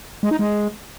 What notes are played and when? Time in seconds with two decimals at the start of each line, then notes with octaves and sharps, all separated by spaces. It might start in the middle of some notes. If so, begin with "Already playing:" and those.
0.23 G#3
0.31 D#4
0.39 G#3